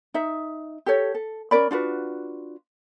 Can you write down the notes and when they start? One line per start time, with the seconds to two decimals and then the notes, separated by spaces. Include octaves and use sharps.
0.14 D#4 E5
0.86 G4 A4 C#5
1.15 A4
1.51 C#4 A#4 D5 B5
1.71 D4 F4 F#4 B4